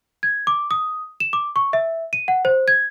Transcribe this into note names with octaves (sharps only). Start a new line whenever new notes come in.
G#6
D6
D#6
E7
D6
C#6
E5
D#7
F#5
C5
G#6